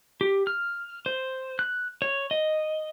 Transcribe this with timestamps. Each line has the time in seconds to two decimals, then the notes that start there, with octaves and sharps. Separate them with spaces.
0.21 G4
0.47 F6
1.06 C5
1.59 F#6
2.02 C#5
2.31 D#5